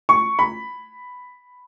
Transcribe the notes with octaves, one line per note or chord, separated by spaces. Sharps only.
C#6
B5